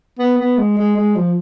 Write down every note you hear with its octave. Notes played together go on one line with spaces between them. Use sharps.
B3
B3
G#3
G#3
G#3
F3